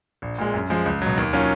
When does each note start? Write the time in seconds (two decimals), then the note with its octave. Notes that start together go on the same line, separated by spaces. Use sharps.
0.22 A#1
0.39 A#2 G#3
0.54 F#2
0.70 F3 G#3
0.86 C#2
1.02 B2 F#3
1.18 D#2
1.33 D#3 F#3 C#4 F4